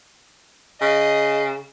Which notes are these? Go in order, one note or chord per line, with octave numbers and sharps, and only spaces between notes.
C#3 D#5